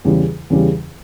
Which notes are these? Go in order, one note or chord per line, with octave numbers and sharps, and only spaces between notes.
E2 C#3 G3
E2 C#3 G3